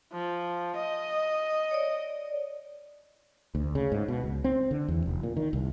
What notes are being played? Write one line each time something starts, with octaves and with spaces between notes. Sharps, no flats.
F3
D#5
C#5 D5
D2
C#3
G#2
B2
C#2
C4
D3
E2
F1
A#2
D#3
C2